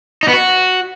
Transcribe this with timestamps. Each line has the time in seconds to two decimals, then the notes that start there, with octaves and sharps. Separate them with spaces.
0.23 D#4
0.28 B3
0.33 F#4